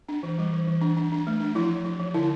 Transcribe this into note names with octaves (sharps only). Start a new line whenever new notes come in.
D4
E3
G3
E3
E3
D4
D4
D4
A3
D4
F3 E4
F3
F3
F3
D3 E4